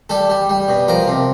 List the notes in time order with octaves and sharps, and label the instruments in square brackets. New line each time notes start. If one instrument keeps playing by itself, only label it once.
[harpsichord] G3 A4
G3
G3
B2
F3 A#4
C3